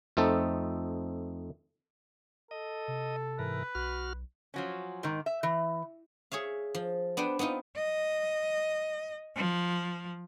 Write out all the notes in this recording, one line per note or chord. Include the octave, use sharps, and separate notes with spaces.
F2 A3 C4 D#4 A4
A4 D#5
C3
G#2 E3 A#4 B4
B1 F#4 F6
F3 F#3 C#4
G#2 D#3
E5
E3
G#4 C#5 E5 F5
F3
B3 D4 B4 C5 G5
B3 C4 D#4 F4
D#5
F3